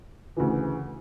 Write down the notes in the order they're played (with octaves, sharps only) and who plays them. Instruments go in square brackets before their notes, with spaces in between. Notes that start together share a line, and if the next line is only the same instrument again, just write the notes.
[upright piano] D2 C#3 E3